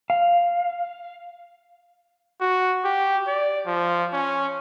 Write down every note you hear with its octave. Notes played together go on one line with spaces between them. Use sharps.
F5
F#4
G4
D5
F3
C#4